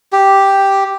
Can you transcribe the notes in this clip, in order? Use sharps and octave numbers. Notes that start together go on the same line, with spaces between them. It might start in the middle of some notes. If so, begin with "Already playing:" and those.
G4